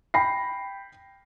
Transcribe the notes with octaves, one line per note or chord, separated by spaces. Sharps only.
G5 B5 A#6 C7